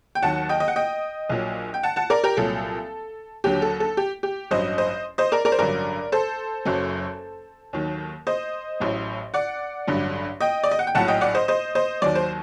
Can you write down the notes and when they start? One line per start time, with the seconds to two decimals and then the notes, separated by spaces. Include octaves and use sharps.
0.15 G5
0.22 D#2 D#3 F#3 F#5 A5
0.49 D#5 G5
0.60 D#5
0.68 F#5
0.76 D#5 G5
1.30 A#1 A#2 F#3
1.74 G5
1.83 F#5 A5
1.96 F#5 A5
2.10 A#4 D5
2.24 G4 A#4
2.37 C2 A#2 F#3 A4
3.44 D#2 D3 F#3 G4
3.62 A4
3.80 A4
3.97 G4
4.23 G4
4.51 A1 G2 F#3 C5 D#5
4.78 C5 D#5
5.18 C5 D#5
5.32 A#4 D5
5.45 A#4 D5
5.52 C5
5.59 A1 G2 D3 F#3 A#4 D5
6.12 A4 C5
6.65 F#1 F#2 F#3
7.73 D#2 D#3 F#3
8.27 C5 D#5
8.80 A1 A2 F#3
9.34 D5 F#5
9.87 A1 G2 D3 F#3
10.41 D#5 G5
10.64 D5
10.71 D#5
10.79 F#5
10.87 G5
10.95 A#1 A2 F#3 F#5 A5
11.08 D#5 G5
11.21 D5 F#5
11.35 C5 D#5
11.48 C5 D#5
11.75 C5 D#5
12.02 D#2 D#3 F#3 D5
12.15 C5